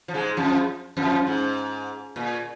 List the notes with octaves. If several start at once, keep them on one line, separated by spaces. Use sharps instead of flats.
F3
G#2 G#3
F2 F3
F2 F3
G#2
A#2